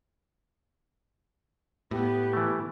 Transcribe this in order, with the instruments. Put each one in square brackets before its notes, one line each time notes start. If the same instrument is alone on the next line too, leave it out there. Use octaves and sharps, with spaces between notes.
[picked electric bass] A2 [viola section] B3 [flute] G4
[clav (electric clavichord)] E3 A3